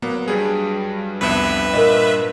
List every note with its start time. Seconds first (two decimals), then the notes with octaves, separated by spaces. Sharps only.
0.02 F#3 A#3 B3
0.28 G2 G3 G#4
1.21 C2 F2 B3 B4 E5
1.73 A#2 A#4 D#5